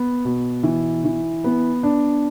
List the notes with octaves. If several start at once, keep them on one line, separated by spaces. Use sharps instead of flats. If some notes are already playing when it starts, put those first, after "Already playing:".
Already playing: B3
B2
E3
E3
B3
D4